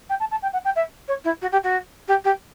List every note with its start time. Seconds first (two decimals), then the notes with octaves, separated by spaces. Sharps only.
0.09 G5
0.20 A5
0.31 A5
0.42 G5
0.53 F#5
0.65 G5
0.76 E5
1.08 C#5
1.24 E4
1.41 F#4
1.52 G4
1.63 F#4
2.08 G4
2.24 G4